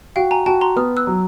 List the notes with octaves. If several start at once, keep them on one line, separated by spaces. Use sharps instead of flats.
F#4 F5 G5
G#5 A#5
F#4 G5 A5
A#5 C6
B3 D#6 F6
E6 F#6
F#3